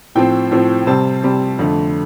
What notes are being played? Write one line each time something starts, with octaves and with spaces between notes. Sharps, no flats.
A2 F3 C4 G5
A2 F3 C4
C3 G3 C4 A5
C3 G3 C4
F2 D3 A3